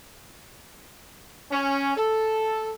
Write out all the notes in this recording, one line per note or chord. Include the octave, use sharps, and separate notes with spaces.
C#4
A4